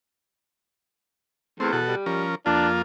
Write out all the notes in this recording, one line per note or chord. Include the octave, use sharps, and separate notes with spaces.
E2 A3 C4
B2 F#4 A4
G3
F3 C#4 A#4
F2 A#3 D4 F4